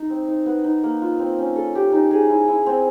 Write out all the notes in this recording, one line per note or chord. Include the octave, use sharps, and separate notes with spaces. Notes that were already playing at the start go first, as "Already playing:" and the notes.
Already playing: D#4
C4
D#4
B3
D#4
A#3
F4
C4
C#4
A4
G4
D#4
G#4
E4
E4
C4